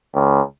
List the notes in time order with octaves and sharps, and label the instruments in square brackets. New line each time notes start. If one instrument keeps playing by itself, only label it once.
[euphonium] C#2